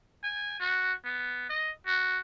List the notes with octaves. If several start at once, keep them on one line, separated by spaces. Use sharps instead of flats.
G#5
F#4
B3
D#5
F#4